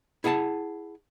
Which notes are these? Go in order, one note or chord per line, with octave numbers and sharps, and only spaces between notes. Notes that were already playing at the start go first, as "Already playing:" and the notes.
E4 G#4 F#5 G#5 A5